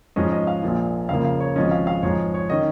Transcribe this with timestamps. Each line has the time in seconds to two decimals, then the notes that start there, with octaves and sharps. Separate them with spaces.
0.16 G#2 F3 G#3 C#4 D#5
0.32 D#5
0.47 F5
0.63 A#1 A#2 F3
1.09 C#2 C#3 F3 A#3 F5
1.25 F5
1.40 C#5
1.56 G#1 G#2 F3 G#3 C#4 D#5
1.71 F5
1.87 F5
2.03 G#2 F3 G#3 C#5
2.34 C#5
2.50 D#3 C#4 D#5